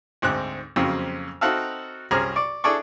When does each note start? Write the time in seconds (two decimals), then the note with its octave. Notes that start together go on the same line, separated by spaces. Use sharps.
0.22 D2 G#2 C4 F#6
0.76 F2 C#3 F#3 A#3 C4
1.41 C4 D#4 F#4 A4 E5 F5
2.11 C2 C#4 G#4 C5 A#5 F6
2.36 D5 C#6
2.64 D4 E4 G#4 A4 D5 C#6